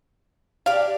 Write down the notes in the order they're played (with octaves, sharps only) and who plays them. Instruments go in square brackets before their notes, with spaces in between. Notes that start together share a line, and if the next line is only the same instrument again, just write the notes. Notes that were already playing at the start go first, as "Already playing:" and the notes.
[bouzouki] D4 G4 [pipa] F5